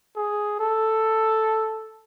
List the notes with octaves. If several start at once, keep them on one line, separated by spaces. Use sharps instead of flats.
G#4
A4